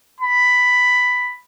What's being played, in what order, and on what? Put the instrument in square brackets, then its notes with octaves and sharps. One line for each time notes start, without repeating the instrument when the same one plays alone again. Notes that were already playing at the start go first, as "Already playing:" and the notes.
[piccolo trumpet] B5